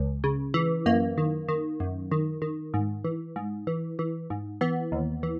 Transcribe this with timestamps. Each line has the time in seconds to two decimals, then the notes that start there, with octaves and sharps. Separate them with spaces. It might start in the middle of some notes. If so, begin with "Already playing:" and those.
Already playing: C#2
0.24 C#3
0.54 E3
0.86 F#2 A#3
1.18 D#3
1.49 D#3
1.80 F#2
2.12 D#3
2.42 D#3
2.74 G#2
3.04 E3
3.36 G#2
3.67 E3
3.99 E3
4.30 G#2
4.61 E3 B3
4.92 D#2
5.23 E3